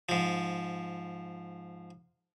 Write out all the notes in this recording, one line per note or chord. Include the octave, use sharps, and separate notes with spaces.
G#2 F3